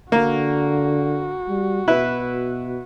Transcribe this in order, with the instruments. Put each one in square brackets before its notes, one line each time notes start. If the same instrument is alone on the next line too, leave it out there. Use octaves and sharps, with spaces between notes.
[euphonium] D3 [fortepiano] A#3 [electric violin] F#4
[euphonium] G3
[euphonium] B2 [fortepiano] E4 B4